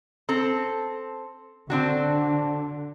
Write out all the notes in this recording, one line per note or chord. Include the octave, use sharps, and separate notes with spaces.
C4 A4
D3 C4 D4 F#4